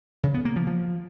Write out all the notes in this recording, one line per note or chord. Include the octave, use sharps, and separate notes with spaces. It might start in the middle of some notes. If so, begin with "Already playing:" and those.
C#3
B3
A#3
F3
F3